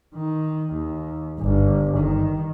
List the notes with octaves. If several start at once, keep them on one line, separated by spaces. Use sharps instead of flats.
D#3
D#2
G1
D#3